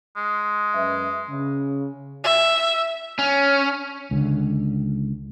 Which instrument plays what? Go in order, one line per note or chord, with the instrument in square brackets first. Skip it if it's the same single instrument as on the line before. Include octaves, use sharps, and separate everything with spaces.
[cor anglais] G#3
[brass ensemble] F#2 B4 E5
C#3
[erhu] E5
[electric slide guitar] C#4
[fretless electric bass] C#2 D3